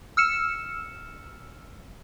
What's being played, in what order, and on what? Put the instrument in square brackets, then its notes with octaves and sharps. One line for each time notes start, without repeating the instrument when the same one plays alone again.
[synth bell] E6 F6 C#7 E7